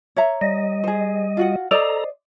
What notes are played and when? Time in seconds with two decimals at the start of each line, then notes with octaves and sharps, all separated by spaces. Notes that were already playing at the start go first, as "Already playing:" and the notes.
0.16 C#5 E5 A#5
0.41 G3 D#5
0.84 G#4 C5
1.37 F4 F#4 F#5
1.71 A4 C5 D5 D#5 A#5